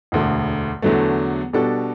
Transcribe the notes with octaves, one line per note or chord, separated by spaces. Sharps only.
E1 D2 D3
E2 D3 F#3 A3
B2 G3 D4 F#4 A4